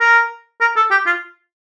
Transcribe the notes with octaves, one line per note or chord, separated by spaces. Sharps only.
A#4
A#4
A4
G4
F4